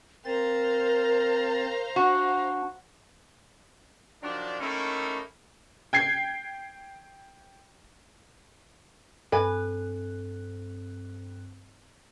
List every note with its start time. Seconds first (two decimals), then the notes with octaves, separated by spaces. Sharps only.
0.25 C4 A#4 C5 F5 A#5 A6
1.96 D4 F#4
4.22 D#3 F3 F#3 D4
4.61 D#3 A3 A#3 C#4 D#4 E4
5.93 G5 G#6 C7
9.32 G2 C4 A4 B4 G#5 F#6